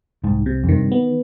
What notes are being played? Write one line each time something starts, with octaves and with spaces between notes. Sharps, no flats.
C2 G#2
C3
F2
G2 D#3
B3